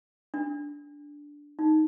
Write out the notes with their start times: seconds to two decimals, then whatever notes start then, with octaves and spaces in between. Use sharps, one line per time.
0.34 D4
1.59 D#4